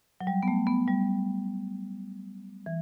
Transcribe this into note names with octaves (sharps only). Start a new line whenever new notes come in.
F#3
G3
B3
A3
B3
G3
E3